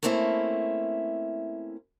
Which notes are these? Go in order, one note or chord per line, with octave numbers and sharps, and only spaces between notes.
A3 A#3 C4 C#4 E4